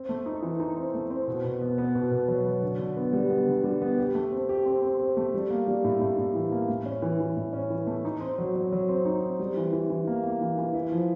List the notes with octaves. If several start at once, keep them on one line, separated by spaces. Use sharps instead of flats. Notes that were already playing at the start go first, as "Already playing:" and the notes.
Already playing: C4
A3
D#4
E3
D#4
C4
A3
C4
B2
B2
B3
B3
B2
B2
F#3
F#3
D3
D3
B3
G3
B3
D3
G3
B3
G4
A3
C4
G4
C4
C4
C4
A3
G3
A#3
G3
A2
A2
A2
E3
A#3
A2
C#4
E3
E3
A2
C#4
E3
A3
D#4
C4
F#3
F#3
F#3
C4
D#4
C4
G3
E3
E3
E3
A#3
A#3
E3
E3
E4
F3